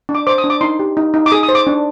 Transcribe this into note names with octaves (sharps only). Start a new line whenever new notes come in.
D4
D6
C5 D6
D#6
D4
D6
D#4 C6
G4
D#4
D#4
D6
G#4 D#6
D#6
C5
D6
D4